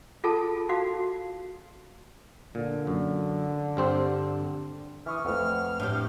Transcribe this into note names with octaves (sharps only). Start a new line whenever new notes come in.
F4 G#4 A4 A5
D#4 F#4 F5
A#2 D3
F#2
G2 C4 C5
E3 E5 C#6 D#6 F6
F2 A3 B4 F#5 F6
A2 D4 G4